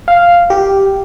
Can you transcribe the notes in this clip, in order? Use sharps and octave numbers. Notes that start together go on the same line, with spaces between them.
F5
G4